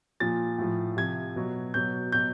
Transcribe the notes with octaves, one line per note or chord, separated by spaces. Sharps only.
A#2 F3 A6
A2 F3
C3 F3 G#6
B2 F#3
B2 F#3 G6
B2 F#3 G6